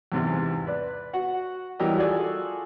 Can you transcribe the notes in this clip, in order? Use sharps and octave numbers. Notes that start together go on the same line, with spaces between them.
E2 G#2 C3
B4 D5
F#4 F#5
E3 F#3 G3 G4 A#4 D#5
F4 F#4 G#4 A4 D5 G#5